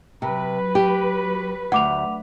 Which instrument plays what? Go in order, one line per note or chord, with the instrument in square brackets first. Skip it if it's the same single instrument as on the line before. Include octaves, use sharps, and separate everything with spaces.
[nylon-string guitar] C3 [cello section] F#3 B4
[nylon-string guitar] G4
[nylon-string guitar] D2 [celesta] F#5 D6 F7